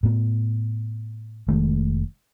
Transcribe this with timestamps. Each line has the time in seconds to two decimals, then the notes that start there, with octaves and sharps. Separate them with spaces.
0.03 A2 B3
1.48 F1 D#3 G#3 A3